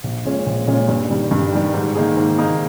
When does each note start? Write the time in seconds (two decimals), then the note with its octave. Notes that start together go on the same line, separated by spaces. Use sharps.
0.04 A#1
0.25 A#2 G#3 C#4
0.46 A#1
0.67 A#2 G#3 C#4
0.89 G2
1.10 D#3 G3
1.31 G2
1.53 D#3 G3
1.74 G#2
1.95 D#3 A#3 D#4 G#4
2.17 G#2
2.38 D#3 A#3 D#4 G#4